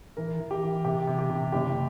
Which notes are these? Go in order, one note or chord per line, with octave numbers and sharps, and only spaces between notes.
E3 A#4
E3
G4
E3
C3 G4
C3
G4
C3
F#1 G4